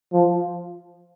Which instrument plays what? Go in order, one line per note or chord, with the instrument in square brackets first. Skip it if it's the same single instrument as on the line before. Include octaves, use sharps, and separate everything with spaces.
[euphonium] F3